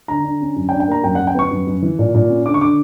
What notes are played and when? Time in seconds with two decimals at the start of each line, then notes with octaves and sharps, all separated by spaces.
0.08 D3 A#5
0.25 D3
0.41 C#4
0.56 F#2
0.69 G5
0.71 D4
0.80 G5
0.88 A#3 A#5
1.03 F#2 G5
1.15 F#2 F#5
1.27 G5
1.35 B3 C#6
1.51 F#2
1.67 F#2
1.82 E3
1.99 A#2
2.15 A#2
2.29 C#4
2.46 D3 D6
2.54 C#6
2.61 D3 D6